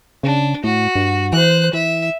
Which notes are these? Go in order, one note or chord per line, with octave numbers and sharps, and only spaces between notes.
C#3 D4
A2 F#4
G2
E3 C5 F#6
E3 E5